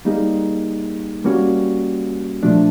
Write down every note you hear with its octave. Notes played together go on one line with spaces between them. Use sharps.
G3 A#3 D#4 G#4
G3 A#3 C#4 F#4
A#2 F3 A3 D4